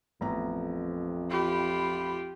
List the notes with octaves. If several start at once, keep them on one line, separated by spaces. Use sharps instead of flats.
A1 F2 B3 A#5
F4 G4 B5